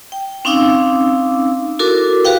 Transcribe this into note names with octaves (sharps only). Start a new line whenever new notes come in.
G5
C4 C#4 D#4 F5 D6 E6
E4 F#4 A4 A#4 D6
F#4 G4 B4 F5 G5